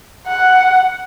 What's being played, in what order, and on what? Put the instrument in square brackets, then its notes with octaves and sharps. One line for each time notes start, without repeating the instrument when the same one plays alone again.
[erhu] F#5